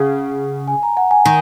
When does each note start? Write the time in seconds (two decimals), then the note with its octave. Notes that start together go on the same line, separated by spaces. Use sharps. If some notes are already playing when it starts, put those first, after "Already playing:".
Already playing: C#3 F#5
0.68 G#5
0.83 A#5
0.97 F#5
1.11 G#5
1.25 D#3